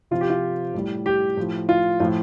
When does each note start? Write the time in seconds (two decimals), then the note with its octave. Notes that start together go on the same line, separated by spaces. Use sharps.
0.11 C3 F3 F4
0.21 G4
0.30 F4
0.74 A2 G3
1.06 G4
1.37 A2 F3
1.69 F4
2.00 A2 F3 F4